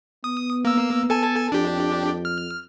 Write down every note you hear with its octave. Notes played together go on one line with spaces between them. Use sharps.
B3 D#6
A#3 E6
A4 G#5 A5
F2 D4 G4
F6